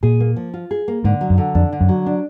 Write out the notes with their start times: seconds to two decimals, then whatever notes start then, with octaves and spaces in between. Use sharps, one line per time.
0.03 A#2 G#4
0.20 A#3
0.36 F3
0.54 F4
0.71 G#4
0.88 A#3
1.04 G#2 D3
1.21 F#3
1.30 F#2
1.38 D3
1.55 F2 D4
1.72 D3
1.81 F#2
1.89 F#3
2.06 D4